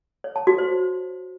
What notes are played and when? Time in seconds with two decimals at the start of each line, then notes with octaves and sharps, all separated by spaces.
0.24 C#5
0.36 A5
0.47 F#4
0.58 C5